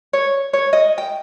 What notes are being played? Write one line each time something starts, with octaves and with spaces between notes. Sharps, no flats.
C#5
C#5
D#5
G5